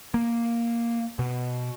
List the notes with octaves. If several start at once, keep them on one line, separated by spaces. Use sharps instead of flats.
A#3
B2